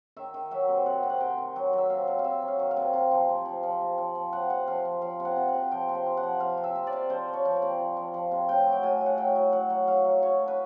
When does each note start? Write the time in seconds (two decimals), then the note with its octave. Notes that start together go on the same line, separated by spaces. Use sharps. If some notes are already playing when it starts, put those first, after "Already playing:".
0.16 D#3 E5
0.34 D#3
0.51 F#3 E5
0.69 C3
0.86 C3 F#5
1.03 C3
1.10 F#5
1.20 C3 G5
1.38 D#3
1.56 F#3
1.73 F#3 E5
1.90 C3 F5
2.08 C3
2.19 F5
2.24 C3 E5
2.42 F#3
2.48 F5
2.59 D#3
2.71 F5
2.77 C3
2.93 C3
3.11 F3
3.29 C3
3.45 F3
3.63 F3
3.81 C3
3.98 F3
4.15 F3
4.32 C3 F#5
4.50 C3 F#5
4.67 F3 F5
4.85 F3
5.01 F3 F5
5.20 C3
5.25 F#5
5.37 C3
5.49 F#5
5.54 C3
5.72 F3 G5
5.89 C3
5.95 G5
6.06 F3
6.17 F#5
6.23 F3
6.40 F3 F5
6.58 C3
6.64 E5
6.76 C3
6.87 D5
6.93 C3
7.10 F3 C5
7.28 F3
7.33 C#5
7.45 F3
7.56 D5
7.62 C3
7.79 F3
7.97 F3
8.14 F3
8.31 C3
8.49 A2 G5
8.67 F#3
8.72 G5
8.83 A2 G#5
9.01 A2
9.06 F#5
9.18 F#3 G5
9.36 F#3
9.53 F#3 F#5
9.70 F#3
9.87 F#3 F5
10.05 F#3
10.22 F#3 C#5
10.39 A2
10.48 B4